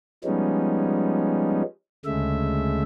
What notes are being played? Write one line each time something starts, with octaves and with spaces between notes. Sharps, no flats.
F3 G3 G#3 B3 C#4 D#4
D2 C#3 G#3 A3 E5